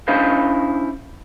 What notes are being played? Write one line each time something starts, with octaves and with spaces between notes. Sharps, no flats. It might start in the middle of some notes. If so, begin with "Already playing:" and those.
C#4 D4 E4 C5 D#5 F5